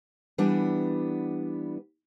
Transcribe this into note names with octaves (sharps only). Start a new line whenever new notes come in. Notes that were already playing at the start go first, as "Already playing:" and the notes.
E3 G3 B3 D4